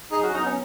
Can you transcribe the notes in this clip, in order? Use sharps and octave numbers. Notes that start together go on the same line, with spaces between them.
F#2 D#4 G#4
C#4 F#4
F#3 B3 D#4
C#4